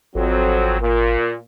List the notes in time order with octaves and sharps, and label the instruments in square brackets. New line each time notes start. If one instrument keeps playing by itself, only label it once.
[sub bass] G#1 [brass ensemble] F2 F#3 C4
[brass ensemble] A#2